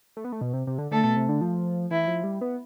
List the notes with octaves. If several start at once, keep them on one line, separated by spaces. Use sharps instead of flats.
A3
B3
A3
B2
C3
C3
D3
D3 A3 A4
B2
C3
D3
F3
E3 E4
F3
G3
B3